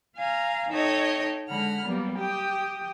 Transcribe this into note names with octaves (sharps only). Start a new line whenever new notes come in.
F5 G#5 A#5
D#4 A4 C#5 D#5 E5 G5
D3 G#3 F#5 B5 F6
F#3 G3 A#3 B3 G4
G4 G5 D#6